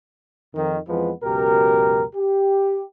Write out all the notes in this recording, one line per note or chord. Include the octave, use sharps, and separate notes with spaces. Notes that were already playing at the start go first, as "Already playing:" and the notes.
F2 D#3
F2 E3 F3 G#3 B3 B4
C#2 F#2 B2 G4 A#4
G4